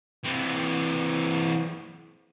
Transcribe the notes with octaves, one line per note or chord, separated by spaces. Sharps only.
E3 C4